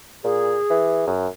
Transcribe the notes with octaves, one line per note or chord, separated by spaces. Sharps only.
A#2 G#4
E3
F#2